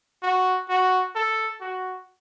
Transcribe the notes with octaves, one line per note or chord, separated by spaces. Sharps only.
F#4
F#4
A4
F#4